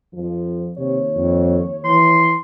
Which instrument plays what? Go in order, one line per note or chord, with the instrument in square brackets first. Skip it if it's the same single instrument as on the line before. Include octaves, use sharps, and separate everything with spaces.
[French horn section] F2 F3
[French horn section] D#2 C#5 [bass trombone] C3
[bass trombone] F2
[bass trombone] E3 [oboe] C6